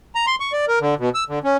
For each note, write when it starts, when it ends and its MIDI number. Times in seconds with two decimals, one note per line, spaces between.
0.15 0.26 82
0.27 0.36 84
0.40 0.52 85
0.52 0.65 74
0.68 0.79 70
0.81 0.94 50
0.99 1.09 47
1.15 1.24 88
1.29 1.39 50
1.44 1.57 61